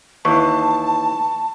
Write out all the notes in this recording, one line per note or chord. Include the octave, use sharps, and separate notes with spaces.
D#2 E3 A5 C#6